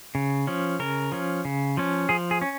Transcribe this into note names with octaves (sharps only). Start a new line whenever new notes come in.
C#3
F3 C#4
C#3 A#4
F3 C#4
C#3
F3 C#4
F3 G#4
G#4
C#4